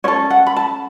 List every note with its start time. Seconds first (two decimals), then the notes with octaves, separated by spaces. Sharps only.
0.04 C#4 A4 C#5
0.30 F#5
0.47 B5
0.56 A5